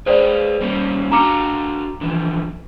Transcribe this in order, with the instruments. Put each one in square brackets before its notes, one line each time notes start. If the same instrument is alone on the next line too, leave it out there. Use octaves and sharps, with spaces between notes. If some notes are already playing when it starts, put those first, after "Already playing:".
[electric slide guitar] G#4 B4 F5 [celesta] C5 D5
[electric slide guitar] G3 A#3 C#4
[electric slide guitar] D4 F#4 F5 [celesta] A#5 D6 C#7
[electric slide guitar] D3 E3 F3